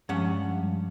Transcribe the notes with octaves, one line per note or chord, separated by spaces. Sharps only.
G2 F3 G#3 C#4 F#5